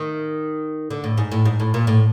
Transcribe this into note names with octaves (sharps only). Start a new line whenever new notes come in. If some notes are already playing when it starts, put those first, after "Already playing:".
Already playing: D#3
D3
A2
G#2
A2
G#2
A2
A#2
A2